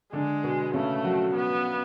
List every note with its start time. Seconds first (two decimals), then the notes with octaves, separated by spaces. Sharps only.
0.13 D3 G#3 D4
0.44 B2 B3
0.74 C#3 A3 C#4
1.04 F#3 F#4
1.35 B3